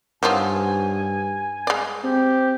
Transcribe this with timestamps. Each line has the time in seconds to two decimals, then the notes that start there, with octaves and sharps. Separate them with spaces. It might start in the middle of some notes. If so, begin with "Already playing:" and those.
0.23 G2 D#3 F3 F#3 G#5
1.67 G#3 D5
2.04 C4 G4